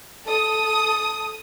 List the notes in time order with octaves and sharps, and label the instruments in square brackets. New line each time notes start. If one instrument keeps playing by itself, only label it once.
[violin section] A4 D#6